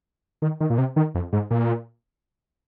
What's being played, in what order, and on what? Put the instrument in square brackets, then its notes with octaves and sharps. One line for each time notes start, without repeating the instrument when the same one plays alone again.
[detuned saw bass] D#3
D#3
A#2
C3
D#3
F2
G#2
A#2